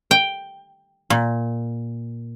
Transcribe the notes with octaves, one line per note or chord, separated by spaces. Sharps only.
G5
A#2